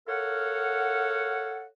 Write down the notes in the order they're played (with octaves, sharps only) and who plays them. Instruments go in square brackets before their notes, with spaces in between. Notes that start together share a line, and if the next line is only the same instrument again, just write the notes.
[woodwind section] A4 A#4 C#5 F5 F#5